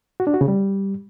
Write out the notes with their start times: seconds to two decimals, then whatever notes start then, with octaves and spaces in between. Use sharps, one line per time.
0.20 F#4
0.27 D4
0.34 F#4
0.41 C#3
0.48 G3